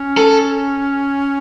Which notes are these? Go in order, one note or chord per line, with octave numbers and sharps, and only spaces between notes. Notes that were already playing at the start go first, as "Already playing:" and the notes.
Already playing: C#4
A4